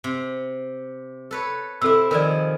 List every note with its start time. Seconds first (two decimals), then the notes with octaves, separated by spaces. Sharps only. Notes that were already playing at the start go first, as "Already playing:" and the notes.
0.04 C3
1.31 A4 B4 C#5
1.81 C3 E4 A4 E6
2.11 D#3 F3 A#4 D5 G#5